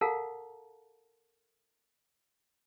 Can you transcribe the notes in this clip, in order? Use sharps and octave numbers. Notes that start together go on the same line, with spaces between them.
A4 A#4 F5 F#5 A5 A#5